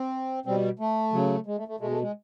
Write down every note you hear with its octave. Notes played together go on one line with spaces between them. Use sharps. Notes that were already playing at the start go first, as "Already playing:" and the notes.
Already playing: C4
B2 G3 C4
A3
C#3 F#3
G#3
A3
A3
B2 G#3 A3
A3
G#3